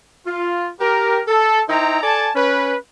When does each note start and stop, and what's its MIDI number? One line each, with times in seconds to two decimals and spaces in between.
0.26 0.68 65
0.80 1.20 67
0.80 1.20 70
1.28 1.62 69
1.69 1.97 63
1.69 1.97 64
1.69 1.97 72
1.69 1.97 79
1.69 1.97 82
2.03 2.29 69
2.03 2.29 74
2.03 2.29 80
2.03 2.29 81
2.35 2.74 61
2.35 2.74 71